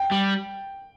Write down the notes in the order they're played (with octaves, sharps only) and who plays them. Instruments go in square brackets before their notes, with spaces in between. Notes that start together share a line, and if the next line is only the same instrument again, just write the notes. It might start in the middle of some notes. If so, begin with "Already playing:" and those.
Already playing: [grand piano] G5
[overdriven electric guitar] G3